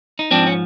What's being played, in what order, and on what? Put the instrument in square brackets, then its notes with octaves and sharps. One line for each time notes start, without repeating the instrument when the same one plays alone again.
[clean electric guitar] D#4
G#2 F3 C4 D4
C#4